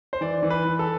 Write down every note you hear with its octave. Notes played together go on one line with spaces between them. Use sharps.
C5
E3 D5
E3
B4
E3
A4